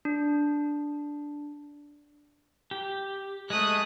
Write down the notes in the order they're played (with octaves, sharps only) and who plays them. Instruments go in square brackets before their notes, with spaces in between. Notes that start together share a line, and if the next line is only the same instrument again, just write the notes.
[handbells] D4
[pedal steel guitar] G4
[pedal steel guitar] G#3 D#5 [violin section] A3 D#6 F#6